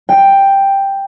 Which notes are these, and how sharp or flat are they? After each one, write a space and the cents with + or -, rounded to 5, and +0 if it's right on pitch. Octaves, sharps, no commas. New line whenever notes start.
G5 +5